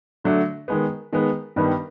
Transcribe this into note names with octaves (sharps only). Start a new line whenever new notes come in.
D3 F#3 A3 D4 F#4
D#3 G#3 B3
D#3 G#3 B3
G2 D#3 G3 B3